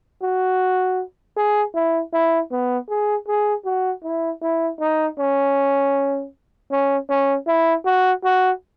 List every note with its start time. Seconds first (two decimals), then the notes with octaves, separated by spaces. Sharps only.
0.22 F#4
1.36 G#4
1.74 E4
2.13 E4
2.51 B3
2.89 G#4
3.27 G#4
3.65 F#4
4.04 E4
4.42 E4
4.80 D#4
5.19 C#4
6.71 C#4
7.09 C#4
7.47 E4
7.85 F#4
8.24 F#4